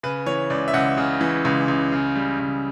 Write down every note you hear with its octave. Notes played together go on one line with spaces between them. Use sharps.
C#3 B4
E3 C#5
C#2 D5
E5
C#2 F#5
C#3
E3
C#2
C#2
C#3
G3
C#2